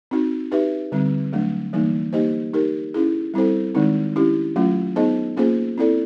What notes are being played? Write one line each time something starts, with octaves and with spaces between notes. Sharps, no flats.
C4 D#4 F#4
D#4 G4 B4 E5
D3 G3 C4
F#3 A3 D4
E3 G3 A#3 D#4
A#3 D#4 G4 C5 D#5
D#4 G4 A#4
C#4 E4 G#4
G3 C4 E4 A4 C5
D#3 G#3 C4 D#4
C#4 E4 G4
F#3 A3 C#4 F4
B3 D#4 G#4 C5 D#5
A#3 C#4 F4 G#4 C5
C4 E4 A4 D5